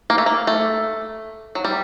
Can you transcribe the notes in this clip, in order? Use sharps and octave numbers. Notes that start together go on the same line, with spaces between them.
A#3
A3
A#3
A3
F#3
G3